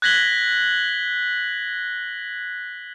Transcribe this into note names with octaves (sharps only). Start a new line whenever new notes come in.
F#6 G#6 A#6 B6 F#7 G7